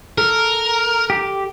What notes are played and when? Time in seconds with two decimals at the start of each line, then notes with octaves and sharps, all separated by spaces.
0.18 A4 A#4
1.10 G4